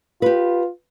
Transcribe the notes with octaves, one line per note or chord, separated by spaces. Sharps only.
F4 G4 B4